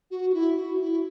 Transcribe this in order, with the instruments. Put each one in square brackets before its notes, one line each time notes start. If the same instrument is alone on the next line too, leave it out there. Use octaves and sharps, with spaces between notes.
[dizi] F#4
F#4
E4
F#4
E4